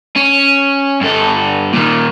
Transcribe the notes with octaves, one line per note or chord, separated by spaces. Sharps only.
C#4
G2 A4
A#2 D#3